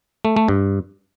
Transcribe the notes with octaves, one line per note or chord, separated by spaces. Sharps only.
A3
A3
G2